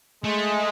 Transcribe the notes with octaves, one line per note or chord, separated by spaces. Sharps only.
G#3 A3